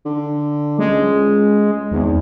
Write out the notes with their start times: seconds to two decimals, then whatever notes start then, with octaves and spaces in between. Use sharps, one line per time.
0.05 D3
0.79 C#2 G#3
1.92 G#1 E2